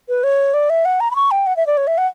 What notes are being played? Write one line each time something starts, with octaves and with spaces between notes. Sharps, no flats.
B4
C#5
D5
E5
F#5
A#5
B5
C#6
G5
F#5
E5
D5
C#5
E5
F#5